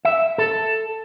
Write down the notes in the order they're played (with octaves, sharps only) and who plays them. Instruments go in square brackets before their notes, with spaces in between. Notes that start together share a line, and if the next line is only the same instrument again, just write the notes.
[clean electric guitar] E5
A4